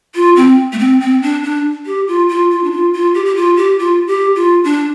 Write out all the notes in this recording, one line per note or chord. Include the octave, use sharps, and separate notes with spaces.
F4
C4
A3
C4
C4
D4
D4
G4
F4
F4
F4
D4
F4
F4
G4
G4
F4
G4
F4
G4
F4
D4